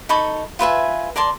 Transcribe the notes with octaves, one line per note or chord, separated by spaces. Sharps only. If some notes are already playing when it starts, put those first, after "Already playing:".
D#4 A4 B5 C#6
F4 B4 E5 G#5
A#4 D5 A5 C6